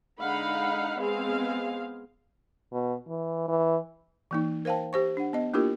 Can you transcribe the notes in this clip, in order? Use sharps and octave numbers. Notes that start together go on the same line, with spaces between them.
D3 G#3 D#4 F5 F#5 B5
G#3 B3 C4 G#4 F5
B2
E3
E3
E3 A#3 D#4
A#4 C5 F5 G5 A5
G4 C5 C#6
D4 F#5
B3 D#5
A#3 D4 E4 F4 G4 A#4